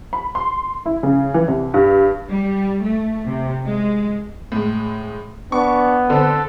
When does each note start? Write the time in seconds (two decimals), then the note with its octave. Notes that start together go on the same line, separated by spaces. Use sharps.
0.13 B5
0.35 C6
0.86 E4
1.03 C#3
1.34 E3
1.48 C2
1.74 G2
2.30 G3
2.83 A3
3.27 C3
3.67 G#3
4.52 A2 G#3
5.52 B3 D4 C#6
6.10 D3 C4 A4